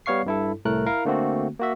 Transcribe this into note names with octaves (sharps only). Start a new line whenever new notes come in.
G3 B3 C#5 F5 C#6 C7
G2 E4 A4
C2 A2 A3 A#4 F#6
E4 A#4 F5
D3 A3 A#3 C4 F#4
A#3 F#4 E5